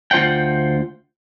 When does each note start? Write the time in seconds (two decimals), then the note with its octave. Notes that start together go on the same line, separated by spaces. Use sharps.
0.11 D2 F4 C5 F#5 G5